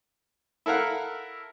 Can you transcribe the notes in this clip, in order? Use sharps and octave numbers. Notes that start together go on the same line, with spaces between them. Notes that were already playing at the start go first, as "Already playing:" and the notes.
E4 A4 A#4 F5 F#5